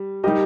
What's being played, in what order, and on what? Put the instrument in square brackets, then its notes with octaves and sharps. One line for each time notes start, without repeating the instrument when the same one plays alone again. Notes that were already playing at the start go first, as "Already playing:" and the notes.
Already playing: [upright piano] G3
[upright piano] G3 D#4 A#4 D#5 [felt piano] G4